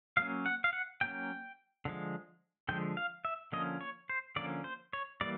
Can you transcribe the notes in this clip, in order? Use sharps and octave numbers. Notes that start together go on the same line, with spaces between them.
F#3 A#3 C#4 F5
F#5
F5
F#5
F#3 A#3 C#4 G5
D3 F3 G#3
D3 F3 G#3 G5
F5
E5
D3 F3 A#3 C#4 D#5
C#5
C5
D3 F3 A#3 C#4 D5
C5
C#5
E3 G3 A#3 D5